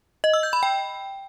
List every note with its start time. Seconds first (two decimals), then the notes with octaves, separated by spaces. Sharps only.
0.24 D#5
0.34 E6
0.43 G6
0.53 B5
0.63 G5